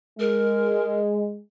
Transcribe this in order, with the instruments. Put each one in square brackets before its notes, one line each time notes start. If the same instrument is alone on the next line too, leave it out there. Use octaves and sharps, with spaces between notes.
[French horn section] G#3 [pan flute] A#4